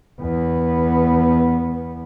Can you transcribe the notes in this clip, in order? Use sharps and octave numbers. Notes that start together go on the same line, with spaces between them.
E2 B3